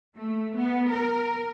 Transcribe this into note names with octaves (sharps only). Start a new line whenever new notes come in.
A3
B3
A#4